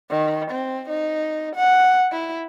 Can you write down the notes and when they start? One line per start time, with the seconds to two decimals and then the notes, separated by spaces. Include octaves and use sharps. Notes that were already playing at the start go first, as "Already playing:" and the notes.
0.10 D#3
0.51 C4
0.89 D#4
1.55 F#5
2.12 E4